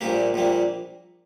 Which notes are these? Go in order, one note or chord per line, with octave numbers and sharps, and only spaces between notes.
A#1 A#2 G3 A#3 G4
A#1 A#2 G3 A#3